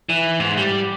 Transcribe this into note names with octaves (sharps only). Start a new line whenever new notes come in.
E3
G#2
G3